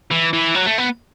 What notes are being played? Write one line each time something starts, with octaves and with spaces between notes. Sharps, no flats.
E3
E3
F#3
A3
B3